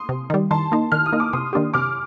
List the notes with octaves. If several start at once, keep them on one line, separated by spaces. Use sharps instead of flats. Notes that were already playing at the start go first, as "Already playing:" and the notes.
Already playing: C6 D#6
C3
D#3 G3
D#3 A5 C6
A#3 D#4
D#3 F6
D#6
A#3 D#4
D6
C3 C6 D#6
D#3 A#3 D4 G4
C3 D6 F6